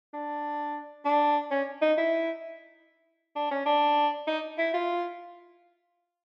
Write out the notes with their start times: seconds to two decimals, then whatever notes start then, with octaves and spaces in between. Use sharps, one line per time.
0.14 D4
1.05 D4
1.51 C#4
1.82 D#4
1.98 E4
3.36 D4
3.51 C#4
3.66 D4
4.27 D#4
4.58 E4
4.74 F4